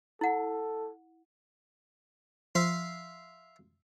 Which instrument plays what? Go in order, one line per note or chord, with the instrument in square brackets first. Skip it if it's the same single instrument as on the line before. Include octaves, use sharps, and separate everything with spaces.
[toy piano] E4 F#5 [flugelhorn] A4
[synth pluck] F3 [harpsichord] E5 F5 C6